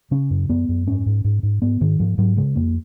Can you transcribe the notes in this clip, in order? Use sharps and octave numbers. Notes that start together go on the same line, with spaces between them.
C#3 C#4
F#2
F#2 B3
F#2
G#2 C#4
G#2
G#2
G#2
G#2 B3
G#2 D#3
G#2 F3
G#2 F#3
C#3 G#3
F2 A#3